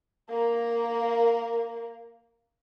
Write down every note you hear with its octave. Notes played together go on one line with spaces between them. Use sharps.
A#3 A#4